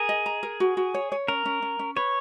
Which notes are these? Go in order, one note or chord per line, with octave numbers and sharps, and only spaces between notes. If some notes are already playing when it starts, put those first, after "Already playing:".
Already playing: G#4 A#4
D#5
A#5
A#4
F#4
F#4
C#5
C#5
C#4 A#4
C#4
C#4
C#4
B4 C#5